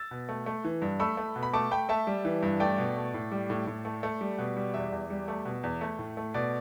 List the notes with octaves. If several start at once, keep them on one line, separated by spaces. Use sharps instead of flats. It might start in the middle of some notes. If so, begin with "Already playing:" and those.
Already playing: E6 A6
B2
A3
A3
E3
G2
A3 B5 E6
A3
B2
B5
A3 A5 D6
A3 G5 B5
A3 E5 A5
G3
E3
G2
A3 D5 G5
B2
A3
A2
G3
A2
A2
A3
A3
G3
B2
G3
E2 E5
E2
G3
A3
B2
E2
A3
A2
A3
B2 D5